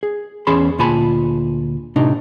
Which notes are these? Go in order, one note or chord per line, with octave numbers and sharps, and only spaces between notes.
G#4
E2 C#4 G#4 A5 B5 C6
D2 A#2 F4 G#5 A5 B5
A2 C3 D4 D#4